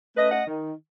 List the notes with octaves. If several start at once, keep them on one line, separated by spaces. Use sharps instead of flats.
A3 C#4 B4 D#5
D#5 F#5
D#3